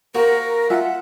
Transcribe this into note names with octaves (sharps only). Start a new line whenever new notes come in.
A#3 F#4 G4 A#4 C5
F4 E5 F#5 G#5